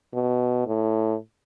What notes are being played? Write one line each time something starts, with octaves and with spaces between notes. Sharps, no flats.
B2
A2